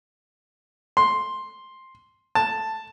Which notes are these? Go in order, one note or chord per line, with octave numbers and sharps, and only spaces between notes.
C6
A5